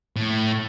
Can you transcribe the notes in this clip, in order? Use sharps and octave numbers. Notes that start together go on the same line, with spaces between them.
A2